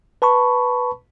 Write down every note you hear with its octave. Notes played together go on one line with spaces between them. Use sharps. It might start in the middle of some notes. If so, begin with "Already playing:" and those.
B4 A5 B5 C#6